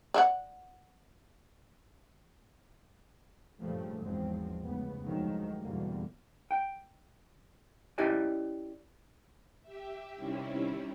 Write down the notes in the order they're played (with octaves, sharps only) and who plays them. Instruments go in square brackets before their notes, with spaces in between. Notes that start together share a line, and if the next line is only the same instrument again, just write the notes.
[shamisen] D5 E5 F#5
[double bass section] G2 A#2 C#3 F3 G3 A3
G#1 E2 F3 F#3 G#3 C4
F1 C#2 B3
D2 D#3 F3 F#3 G#3
E2 G2 B2 D3 G3 A#3
[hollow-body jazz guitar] G5
C#4 E4 G4 D5 D#5 G#5
[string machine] G4 E5
C3 D#3 G3 C4 C#4 E4